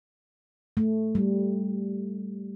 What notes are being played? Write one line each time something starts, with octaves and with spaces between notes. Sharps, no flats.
A3
G3